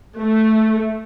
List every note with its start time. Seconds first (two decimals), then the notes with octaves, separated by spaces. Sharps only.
0.17 A3